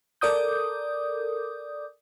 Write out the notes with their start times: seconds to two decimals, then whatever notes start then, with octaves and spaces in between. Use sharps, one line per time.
0.21 A4 A#4 D5 D6 D#6 G6